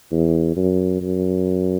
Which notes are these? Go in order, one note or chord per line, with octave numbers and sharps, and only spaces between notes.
E2
F#2
F#2